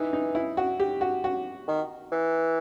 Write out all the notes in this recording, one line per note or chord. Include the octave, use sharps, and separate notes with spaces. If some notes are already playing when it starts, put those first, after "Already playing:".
Already playing: E3 D#4
D#4
E4
F#4
G4
F#4
F#4
D#3
E3